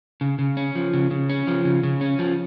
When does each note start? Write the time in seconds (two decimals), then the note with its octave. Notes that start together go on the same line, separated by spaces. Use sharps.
0.21 C#3
0.39 C#3
0.57 C#4
0.75 F3
0.93 C#3
1.11 C#3
1.30 C#4
1.47 F3
1.65 C#3
1.83 C#3
2.01 C#4
2.19 F3